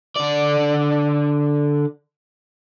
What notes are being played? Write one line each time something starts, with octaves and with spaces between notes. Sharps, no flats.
D3 D5